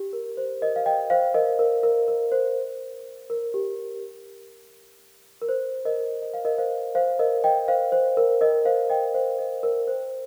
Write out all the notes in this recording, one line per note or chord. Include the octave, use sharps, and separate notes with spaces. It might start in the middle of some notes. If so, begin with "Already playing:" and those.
Already playing: G4
A#4
C5
A#4 D#5
F5
D#5 G5
C5 F5
A#4 D#5
A#4
A#4
A#4
C5
A#4
G4
A#4
C5
A#4 D#5
D#5
F5
A#4 D#5
C5 F5
C5 F5
A#4 D#5
D#5 G5
C5 F5
C5
A#4
A#4 D#5
C5 F5
D#5 G5
C5 F5
A#4 D#5
A#4
C5